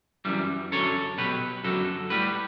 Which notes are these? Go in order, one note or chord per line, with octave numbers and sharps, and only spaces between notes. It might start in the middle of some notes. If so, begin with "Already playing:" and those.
F#2 E3 G3
F#2 D3 F#3 A4 C#5
B2 F#3 G4 B4
F#2 D3 F#3 F#4 A4
A2 G3 G4 B4